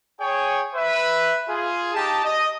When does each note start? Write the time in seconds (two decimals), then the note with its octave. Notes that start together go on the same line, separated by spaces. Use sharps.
0.19 G#4 C#5 G5 G#5
0.74 B4 E5
1.48 F4 G#4
1.94 D#4 G4 A5
2.24 D#5